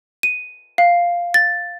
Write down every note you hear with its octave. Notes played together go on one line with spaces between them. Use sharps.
D#7
F5
A6